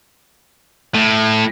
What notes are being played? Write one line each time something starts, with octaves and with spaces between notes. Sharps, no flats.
A2